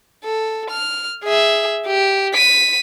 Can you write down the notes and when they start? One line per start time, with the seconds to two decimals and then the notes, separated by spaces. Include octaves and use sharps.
0.24 A4
0.70 F6
1.24 G#4 E5
1.87 G4
2.34 B6 D#7